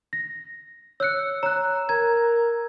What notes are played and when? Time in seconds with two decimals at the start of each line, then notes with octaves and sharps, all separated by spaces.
0.13 A#6
1.00 C#5 E6 F#6 C#7
1.43 C#5 A#5 F#6
1.89 A#4 A#5 G#6